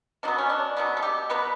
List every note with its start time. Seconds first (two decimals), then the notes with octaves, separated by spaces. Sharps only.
0.23 B2 F#3 B3 D4
0.38 C#4
0.50 D4
0.77 B2 F#3 B3
0.97 A4
1.03 G4
1.30 B2 F#3 B3 B4